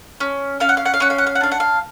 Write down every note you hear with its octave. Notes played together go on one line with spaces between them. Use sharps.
C#4
C#4 F5
F#5
F5
F#5
F5
C#4 F#5
F5
F#5
F5
F#5
D4 F5
F#5
F5